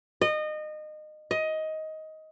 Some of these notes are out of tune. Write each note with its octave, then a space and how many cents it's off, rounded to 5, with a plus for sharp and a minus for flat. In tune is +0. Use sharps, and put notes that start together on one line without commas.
D#5 -25
D#5 +15